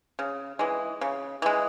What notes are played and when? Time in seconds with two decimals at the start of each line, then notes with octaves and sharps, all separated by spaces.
0.19 C#3
0.59 E3 G#3
1.01 C#3
1.42 E3 G#3